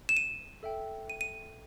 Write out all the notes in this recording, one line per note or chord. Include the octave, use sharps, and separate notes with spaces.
E7
D#7
A4 E5 G5
D#7
D#7